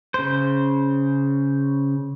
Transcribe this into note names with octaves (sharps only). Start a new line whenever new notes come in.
C#3 C5